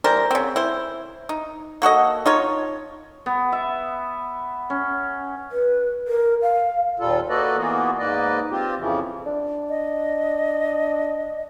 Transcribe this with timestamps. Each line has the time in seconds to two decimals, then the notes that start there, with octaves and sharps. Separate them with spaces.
0.04 E3 G3 A#4 C5
0.31 C#3 C4
0.56 E4 C5
1.29 D#4
1.82 A#3 F#4 A4 D#5
2.26 D#4 F4 C#5
3.26 B3
3.52 E5
4.70 C#4
5.52 B4
6.08 A#4
6.42 F5
7.00 D#2 A#2 G3 F4 A4
7.29 A#3 F#4 A4 B4 D5 D#5
7.57 E3 A#3 B3 F4 F#4 G#4
7.98 G#2 A#3 B4 D5 D#5
8.51 C4 F4 G4
8.78 F2 C#3 E3 F3
9.26 D4
9.69 D#5